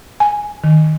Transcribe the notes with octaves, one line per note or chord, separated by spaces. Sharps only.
G#5
D#3